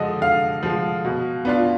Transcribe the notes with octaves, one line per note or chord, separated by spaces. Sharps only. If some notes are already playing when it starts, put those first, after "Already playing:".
Already playing: D3 F3 G#3 D#5
D3 F5
F3 G#3
B2
B3 D4 F4